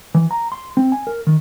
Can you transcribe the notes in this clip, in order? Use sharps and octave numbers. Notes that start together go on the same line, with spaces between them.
E3
A#5
C6
C4
G#5
A#4
D#3